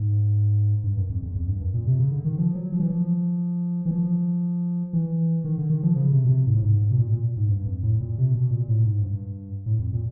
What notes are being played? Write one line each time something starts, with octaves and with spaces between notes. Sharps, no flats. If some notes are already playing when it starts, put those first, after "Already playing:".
Already playing: G#2
G2
F#2
F2
E2
F2
G2
F#2
A#2
C3
C#3
D3
D#3
F3
F#3
F3
E3
F3
E3
F3
E3
D#3
D3
D#3
F3
C#3
C3
B2
C3
G#2
A2
G#2
B2
A#2
A#2
G#2
G2
F2
A2
A#2
C3
B2
A#2
A2
G#2
G2
A2
F2
A#2